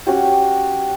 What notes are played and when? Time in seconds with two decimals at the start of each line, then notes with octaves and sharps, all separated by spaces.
0.07 C#4 F#4 G4